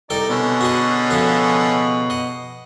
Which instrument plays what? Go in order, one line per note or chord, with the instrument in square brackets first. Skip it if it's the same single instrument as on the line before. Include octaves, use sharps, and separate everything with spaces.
[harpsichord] C2 A4 G5 [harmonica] D#4 D5
[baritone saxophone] B2 [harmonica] D3 C#4
[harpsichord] F#4 G#4 D#5
C#3 F3 A4
D#5 F#5